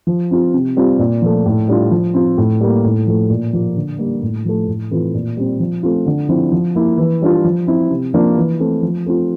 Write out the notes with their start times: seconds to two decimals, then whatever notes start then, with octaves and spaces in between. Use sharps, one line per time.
0.07 F3
0.31 C4 F4
0.54 C3
0.76 G3 C4 F4
0.99 A#2
1.22 F3 A3
1.46 A2
1.68 G3 D4 F4
1.91 F3
2.14 C4 F4
2.37 A2
2.60 G3 A#3
2.84 A2
3.07 F3 A3
3.30 A#2
3.53 F3 A#3 F4
3.76 D3
3.98 G3 A#3
4.22 A2
4.45 F3 A3
4.67 A2
4.91 E3 A3 C4 F4
5.14 A#2
5.37 G3 C4
5.60 F3
5.83 A3 C4 F4
6.06 D3
6.29 F3 C4 E4
6.51 F3
6.75 A#3 E4
6.98 E3
7.22 G3 D4 F4
7.44 F3
7.67 C4 E4
7.90 C3
8.14 F3 A#3 D4 F4
8.36 E3
8.60 A3 C4
8.82 F3
9.06 A3 C4 F4